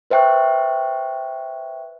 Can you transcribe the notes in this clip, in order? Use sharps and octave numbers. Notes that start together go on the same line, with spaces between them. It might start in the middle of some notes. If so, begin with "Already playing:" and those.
B4 C5 E5 G5 C#6 F#6